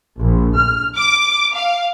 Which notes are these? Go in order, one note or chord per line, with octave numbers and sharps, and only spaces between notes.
A#1
F6
D6
F5